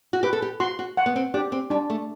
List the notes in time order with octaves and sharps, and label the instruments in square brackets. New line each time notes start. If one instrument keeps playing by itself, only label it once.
[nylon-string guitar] F#4
[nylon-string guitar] G4 [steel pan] B4
[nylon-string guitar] A4
G4
[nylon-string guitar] F#4 [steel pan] C6
[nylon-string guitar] F#4
[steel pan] F#5
[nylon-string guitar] B3
C4
[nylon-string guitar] D4 [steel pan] G4
[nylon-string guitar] C4
[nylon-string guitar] G3 [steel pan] D4
[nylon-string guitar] A3